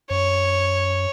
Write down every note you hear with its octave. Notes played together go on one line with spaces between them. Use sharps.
F#2 C#5